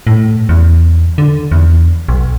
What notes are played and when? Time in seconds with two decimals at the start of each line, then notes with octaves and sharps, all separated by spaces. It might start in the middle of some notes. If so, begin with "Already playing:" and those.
0.07 A2
0.49 E2
1.18 D3
1.52 E2
2.08 B1